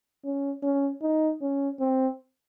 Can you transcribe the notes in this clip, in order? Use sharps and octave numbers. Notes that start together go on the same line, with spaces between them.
C#4
C#4
D#4
C#4
C4